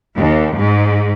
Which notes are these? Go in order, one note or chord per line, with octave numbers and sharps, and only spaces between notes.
D#2
G#2